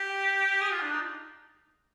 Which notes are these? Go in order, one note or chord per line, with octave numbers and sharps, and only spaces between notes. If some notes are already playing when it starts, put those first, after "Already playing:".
Already playing: G4
G#4
F4
D4
D#4